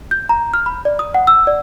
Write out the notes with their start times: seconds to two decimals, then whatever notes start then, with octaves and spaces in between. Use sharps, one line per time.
0.11 G6
0.29 A#5
0.54 F6
0.66 B5
0.85 D5
0.99 D#6
1.14 F#5
1.27 E6
1.47 D5